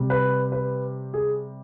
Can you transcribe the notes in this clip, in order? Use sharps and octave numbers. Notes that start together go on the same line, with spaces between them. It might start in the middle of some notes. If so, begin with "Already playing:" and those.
Already playing: C3 G3
B4
B4
G#4